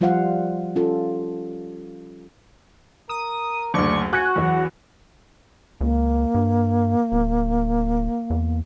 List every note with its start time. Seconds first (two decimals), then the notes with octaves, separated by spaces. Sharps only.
0.01 F3 G3 F4 C5 F5 F#5
0.76 C#4 F4 A4
3.09 A#4 D#6
3.74 F#1 D2 D5 C#6
4.13 F#4 G#5 F#6
4.36 E2 F#3 F#5
5.81 C#2 A#3
6.35 G2
7.12 D1
8.30 E2